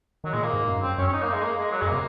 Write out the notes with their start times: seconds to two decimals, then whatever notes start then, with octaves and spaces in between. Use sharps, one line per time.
0.24 D#3 F#3
0.33 A#2 G#3
0.43 A#3
0.53 G#2
0.68 F#2
0.82 F#2 C4
0.98 F#2 C#4
1.08 C#4
1.13 D#4
1.23 A#3
1.32 G#3
1.43 A#3
1.58 G#3
1.72 F#3
1.82 F#2 G#3
1.87 A#3
1.92 C3